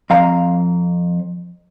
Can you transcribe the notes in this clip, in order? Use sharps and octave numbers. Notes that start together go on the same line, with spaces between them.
F2 F5 A#5